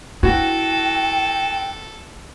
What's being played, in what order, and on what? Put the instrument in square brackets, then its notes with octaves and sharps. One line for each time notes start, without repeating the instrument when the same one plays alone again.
[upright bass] E4 [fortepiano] F#4 [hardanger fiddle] A4 [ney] G5